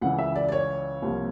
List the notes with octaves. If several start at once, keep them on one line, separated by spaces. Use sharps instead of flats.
C#2 C#3 E3 F#5
E5
D5
D5
C#5
C2 C3 F3 A#3